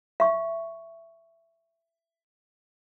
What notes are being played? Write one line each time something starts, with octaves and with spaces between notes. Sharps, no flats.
E5 C#6